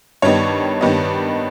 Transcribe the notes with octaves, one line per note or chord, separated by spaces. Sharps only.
G2 D#3 G3 B3 D#4 C#5
G2 D#3 G3 B3 D#4